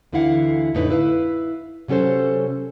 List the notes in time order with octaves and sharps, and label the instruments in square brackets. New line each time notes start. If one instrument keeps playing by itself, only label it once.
[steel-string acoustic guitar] D2 D3 E3 E4 F5 F#5
F2 A2 D3 D#4 B4
E4 B4 F5
C3 F#3 C#4 A4 C5